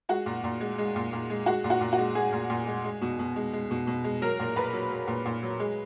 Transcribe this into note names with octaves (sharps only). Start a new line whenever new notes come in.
G#3 F#4
A#2
A#2
G#3
G#3
A#2
A#2
G#3
G#3 F#4
A#2
F#4
A#2
F#4
G#3
G#3 G#4
A#2
A#2
G#3
G#3
B2
B2
G#3
G#3
B2
B2
G#3
F#3 A#4
A#2
A#2 B4
F#3
F#3
A#2
A#2
F#3
G#3